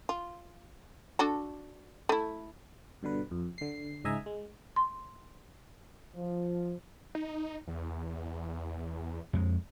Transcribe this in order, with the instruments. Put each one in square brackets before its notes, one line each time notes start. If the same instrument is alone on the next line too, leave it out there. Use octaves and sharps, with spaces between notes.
[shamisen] F4
D4 F#4 A4
A3 E4
[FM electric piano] G2 B2 D3 B4
F2
D3 C7
C#2 G#2 D#5 E5 G#5 A#5
G#3
[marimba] C6
[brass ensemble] F3
[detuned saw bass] D#4
E2
[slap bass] F2 G#3